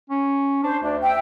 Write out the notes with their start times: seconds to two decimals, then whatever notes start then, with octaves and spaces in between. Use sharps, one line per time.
0.10 C#4
0.64 D4 C5
0.83 D2 D4
1.01 E5 G5